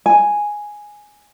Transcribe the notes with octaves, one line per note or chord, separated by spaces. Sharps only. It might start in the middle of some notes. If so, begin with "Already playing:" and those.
G#5